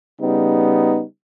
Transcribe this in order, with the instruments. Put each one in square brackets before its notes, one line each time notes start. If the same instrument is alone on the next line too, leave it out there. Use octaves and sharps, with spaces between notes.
[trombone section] C#3 G3 B3 D#4